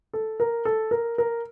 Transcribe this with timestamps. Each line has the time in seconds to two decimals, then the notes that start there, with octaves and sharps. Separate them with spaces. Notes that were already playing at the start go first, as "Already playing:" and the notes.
0.13 A4
0.40 A#4
0.65 A4
0.91 A#4
1.18 A#4